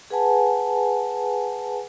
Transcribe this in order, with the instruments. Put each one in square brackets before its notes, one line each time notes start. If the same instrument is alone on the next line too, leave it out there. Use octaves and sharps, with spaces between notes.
[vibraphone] G#4 B4 F#5 G#5 A5